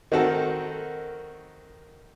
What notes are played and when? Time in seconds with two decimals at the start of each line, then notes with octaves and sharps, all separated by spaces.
0.12 D#3 C4 F#4 A4 A#4